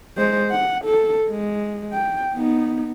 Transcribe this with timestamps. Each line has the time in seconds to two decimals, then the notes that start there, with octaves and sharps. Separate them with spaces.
0.18 G#3 C5
0.51 F#5
0.85 A4
1.30 G#3
1.93 G5
2.34 B3 D#4